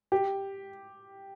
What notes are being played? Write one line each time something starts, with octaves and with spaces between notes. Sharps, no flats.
G4